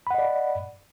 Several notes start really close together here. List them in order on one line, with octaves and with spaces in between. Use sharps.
B5 F#5 D#5 D5